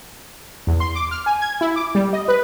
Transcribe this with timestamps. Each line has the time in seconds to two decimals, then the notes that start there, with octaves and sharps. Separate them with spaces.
0.67 E2
0.80 C6
0.95 D6
1.11 F6
1.26 G#5
1.41 G#6
1.61 E4
1.76 D6
1.95 G3
2.13 D#5
2.28 B4